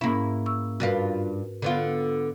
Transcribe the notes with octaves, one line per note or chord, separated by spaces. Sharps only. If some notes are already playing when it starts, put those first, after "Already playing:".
G#2 A#3 C#4 E4
C#6 E6
G2 D4 F4 F#4 A#4 B4
D3 B3 F4